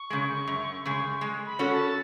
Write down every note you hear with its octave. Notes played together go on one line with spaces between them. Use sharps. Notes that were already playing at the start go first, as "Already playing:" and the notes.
Already playing: C#6
C#3 G#3
F#2
C#3 G#3
G#3
B5
C#4 F#4 A4 C#5
A5